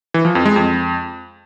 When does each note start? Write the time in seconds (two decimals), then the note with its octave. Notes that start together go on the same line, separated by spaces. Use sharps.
0.14 E3
0.25 F3
0.35 F2
0.45 G#3
0.56 F2